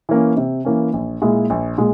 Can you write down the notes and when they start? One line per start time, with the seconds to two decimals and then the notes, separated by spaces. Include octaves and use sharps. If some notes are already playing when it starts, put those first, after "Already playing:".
0.09 E3 A#3 C#4
0.37 C3
0.65 E3 A#3 C#4
0.93 A#1
1.22 A#2 G#3 E4
1.50 A#1
1.78 A#2 G#3